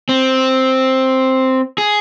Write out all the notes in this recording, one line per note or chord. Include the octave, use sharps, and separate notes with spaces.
C4
G#4